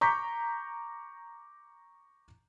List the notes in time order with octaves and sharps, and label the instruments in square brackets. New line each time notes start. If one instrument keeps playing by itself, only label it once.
[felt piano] A#5 C#6 D6 G6 B6